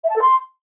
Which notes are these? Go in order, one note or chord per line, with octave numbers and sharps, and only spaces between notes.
E5
A5
A4
C6